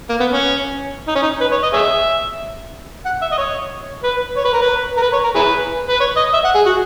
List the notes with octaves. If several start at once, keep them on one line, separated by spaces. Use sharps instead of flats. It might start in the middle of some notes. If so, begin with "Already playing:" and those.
A#3
B3
C#4
D#4
C#4
D#4
B4
C#5
D#5
G#4 C#5 E5
F#5
E5
D#5
C#5
B4
C#5
B4
A#4
B4
A#4
B4
C#5
A#4
E4 G#4 B4
B4
C#5
D#5
E5
F#5
G#4
F#4